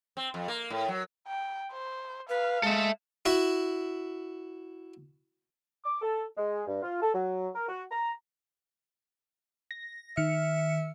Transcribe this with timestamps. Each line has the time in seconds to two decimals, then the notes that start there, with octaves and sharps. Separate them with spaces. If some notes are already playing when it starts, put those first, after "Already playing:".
0.17 C4
0.34 F2
0.48 A#3
0.70 A2
0.88 F#3
1.27 G5
1.72 C5
2.29 B4 F5
2.63 G#3 A4 E5
3.26 E4 F#4 E5
5.84 D6
6.02 A4
6.37 G#3
6.67 G2
6.83 F4
7.02 A4
7.14 F#3
7.55 A#4
7.69 F#4
7.91 A#5
9.71 A#6
10.17 D#3 E5 F6 C#7